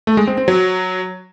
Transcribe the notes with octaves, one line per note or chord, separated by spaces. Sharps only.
A3
G#3
C4
C4
F#3